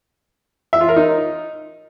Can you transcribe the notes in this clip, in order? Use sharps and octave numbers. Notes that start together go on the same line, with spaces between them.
E5
F4
A#4
D#4